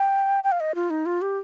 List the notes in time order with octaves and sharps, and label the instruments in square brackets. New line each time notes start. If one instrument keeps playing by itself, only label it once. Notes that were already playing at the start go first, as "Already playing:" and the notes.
Already playing: [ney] G5
G5
F5
D#5
F4
D#4
F4
G4